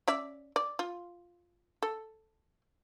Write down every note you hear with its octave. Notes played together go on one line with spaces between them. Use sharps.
C#4 D5 E5
D5
F4
A4